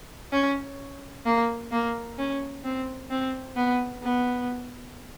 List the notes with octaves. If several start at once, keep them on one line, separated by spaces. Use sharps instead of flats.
C#4
A#3
A#3
C#4
C4
C4
B3
B3